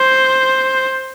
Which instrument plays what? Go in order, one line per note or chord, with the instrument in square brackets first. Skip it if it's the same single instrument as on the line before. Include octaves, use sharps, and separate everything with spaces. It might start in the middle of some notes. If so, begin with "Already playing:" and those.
Already playing: [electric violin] C5